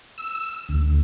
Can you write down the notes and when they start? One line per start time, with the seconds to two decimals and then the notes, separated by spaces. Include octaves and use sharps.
0.18 E6
0.69 D2